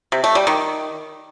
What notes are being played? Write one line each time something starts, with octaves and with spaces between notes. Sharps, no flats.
C3
A3
G3
D#3